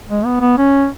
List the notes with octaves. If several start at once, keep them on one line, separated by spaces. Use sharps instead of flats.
G#3
B3
B3
C#4